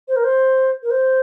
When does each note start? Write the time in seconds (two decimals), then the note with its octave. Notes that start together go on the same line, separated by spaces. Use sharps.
0.08 C5
0.16 A#4
0.24 C5
0.83 A#4
0.90 C5